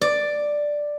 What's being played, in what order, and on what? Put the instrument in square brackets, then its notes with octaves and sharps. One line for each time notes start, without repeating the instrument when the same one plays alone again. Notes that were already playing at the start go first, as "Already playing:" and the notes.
[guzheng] D5